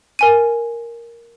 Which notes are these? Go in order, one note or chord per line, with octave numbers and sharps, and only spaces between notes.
A#4 G#5 D#7